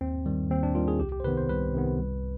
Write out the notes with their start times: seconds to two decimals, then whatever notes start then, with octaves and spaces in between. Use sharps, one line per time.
0.01 D#2 C4
0.26 D#3 G3
0.50 D#2 C4
0.63 D4
0.75 D#3 G3 F4
0.88 G#4
0.99 C2 G4
1.12 G4
1.20 C5
1.24 C3 D#3 B3 B4
1.37 C5
1.49 C2 B4
1.74 C3 D#3 B3
1.98 C2